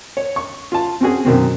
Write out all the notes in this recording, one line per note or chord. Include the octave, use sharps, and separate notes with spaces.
C#5
C#6
F4 A5
C4 C#4 F#4 G#4
F#2 B2 D#3 C4